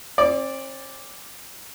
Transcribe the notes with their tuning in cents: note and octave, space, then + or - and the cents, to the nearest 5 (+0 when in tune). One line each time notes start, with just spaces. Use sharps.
C4 +45 D5 +0